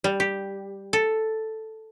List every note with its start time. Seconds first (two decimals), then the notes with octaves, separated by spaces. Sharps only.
0.04 G3
0.20 G4
0.93 A4